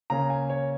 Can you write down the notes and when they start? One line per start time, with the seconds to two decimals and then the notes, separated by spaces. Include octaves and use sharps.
0.10 C#3 A#3 C#4 A#5
0.30 G#5
0.50 C#5